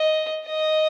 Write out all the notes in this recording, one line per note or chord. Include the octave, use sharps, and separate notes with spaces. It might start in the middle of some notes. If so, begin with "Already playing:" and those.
Already playing: D#5
D#5